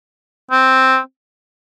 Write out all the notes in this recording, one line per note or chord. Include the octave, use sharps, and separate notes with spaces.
C4